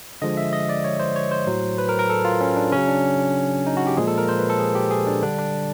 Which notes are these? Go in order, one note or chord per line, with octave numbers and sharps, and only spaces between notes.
D3 F3 G#3 D#5
E5
D#5
D5
C#5
C5
C#5
C5
A2 F#3
B4
A#4
A#4
A4
F4
C#4
D4
C#3 F#3 C#4
D4
D#4
F#4
G4
A#2 F3 G#3 G#4
A4
A#4
C5
B4
A4
G#4
G4
G#4
D4
D3 G3 D4
D4